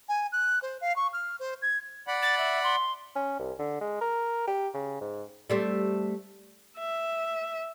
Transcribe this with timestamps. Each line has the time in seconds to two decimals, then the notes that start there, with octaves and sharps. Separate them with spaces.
0.09 G#5
0.32 F#6
0.62 C5
0.81 F5
0.96 C#6
1.13 F6
1.40 C5
1.62 G#6
2.07 D5 F#5 B5
2.22 A6
2.38 E5
2.64 C6
3.16 C#4
3.39 C2
3.59 D3
3.81 G#3
4.01 A#4
4.48 G4
4.74 C#3
5.01 G#2
5.50 G3 A3 C4
6.78 E5